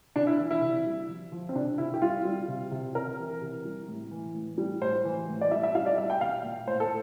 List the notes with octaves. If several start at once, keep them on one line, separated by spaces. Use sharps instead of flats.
C3 D4
E4
E3
E4
C3
G3
F3
F3
C4
C3 D4
C3 E4
G4
G3 F4
G3
C3
C3
C3 A#4
E3
C3
G3
A2
E3
A2
G3
A2 C5
E3
A2
D5
G3 E5
E5
G3 F5
D5
G3 E5
G5
A#2 F5
A#2
A2 C5
A4